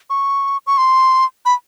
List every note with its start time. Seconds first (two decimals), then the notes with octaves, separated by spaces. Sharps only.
0.10 C#6
0.67 C#6
0.78 C6
1.45 B5